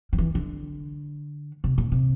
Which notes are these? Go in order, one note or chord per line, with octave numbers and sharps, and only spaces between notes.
F3
E3
D3
C3
A#2
C3